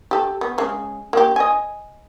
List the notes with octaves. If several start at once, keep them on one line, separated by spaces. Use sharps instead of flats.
G4 A4
B3
C#3 G#3
A#3 G4
D#5 G#5